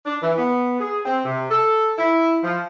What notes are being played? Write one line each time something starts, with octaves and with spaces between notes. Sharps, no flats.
D4
E3
B3
G#4
C4
C3
A4
E4
F3